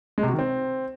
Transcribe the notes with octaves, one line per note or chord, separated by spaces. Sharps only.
G#3
C3
F#4
D#3
C4